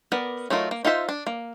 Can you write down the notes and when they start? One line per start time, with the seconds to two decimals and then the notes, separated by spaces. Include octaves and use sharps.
0.12 B3 A#4 D5
0.50 F#3 A3 D#4 F4 A#4
0.71 A#3
0.85 D#4 F4 C5 E5
1.09 D4
1.27 A#3